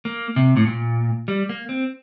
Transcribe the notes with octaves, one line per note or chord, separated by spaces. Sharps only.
A#3
C3
A2
A#2
G3
A#3
C4